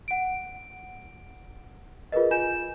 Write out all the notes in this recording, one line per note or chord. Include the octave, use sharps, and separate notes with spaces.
F#5 D7
F4 G#4 A#4 B4 D#5
F4 G#5 G6 E7